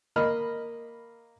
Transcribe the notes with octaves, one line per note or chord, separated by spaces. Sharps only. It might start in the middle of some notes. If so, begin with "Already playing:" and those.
A#3 D#5 B5 F6